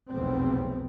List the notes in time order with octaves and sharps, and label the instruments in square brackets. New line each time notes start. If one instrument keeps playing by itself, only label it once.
[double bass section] F1 B1 E2 C#3 B3 C4